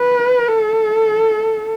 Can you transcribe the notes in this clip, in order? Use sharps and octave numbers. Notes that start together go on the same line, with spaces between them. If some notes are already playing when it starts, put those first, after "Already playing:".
Already playing: B4
A4